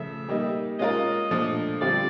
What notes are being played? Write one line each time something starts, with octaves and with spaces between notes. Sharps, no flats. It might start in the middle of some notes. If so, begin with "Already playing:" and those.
Already playing: C#3 F3 A3 E5
G3 A#3 D#4
G#3 C#4 F4 A#4 D#5
A#2 F3 A3 D4
D3 G3 C4 F4 D5